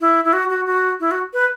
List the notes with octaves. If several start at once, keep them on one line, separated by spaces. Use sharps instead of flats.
E4
E4
F#4
F#4
F#4
E4
F#4
B4